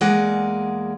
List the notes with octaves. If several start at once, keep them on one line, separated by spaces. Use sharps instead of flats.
E2 G#3 A#3 G#4 D5 F#5